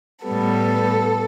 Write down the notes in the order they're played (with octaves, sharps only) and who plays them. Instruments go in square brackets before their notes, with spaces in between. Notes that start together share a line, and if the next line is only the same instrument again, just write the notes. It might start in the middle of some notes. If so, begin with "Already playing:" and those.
[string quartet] A2 G3 B3 A4